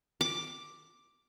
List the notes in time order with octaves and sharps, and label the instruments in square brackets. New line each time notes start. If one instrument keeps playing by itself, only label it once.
[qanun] D6